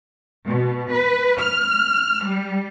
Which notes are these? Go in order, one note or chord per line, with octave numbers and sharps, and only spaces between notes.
B2
B4
F6
G3